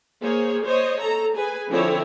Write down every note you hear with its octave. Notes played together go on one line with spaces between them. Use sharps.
A#3 G#4 C5 C#5
C5 C#5 D#5
A4 A#5
G#4 B4 G#5
D3 F3 C4 E4 C#5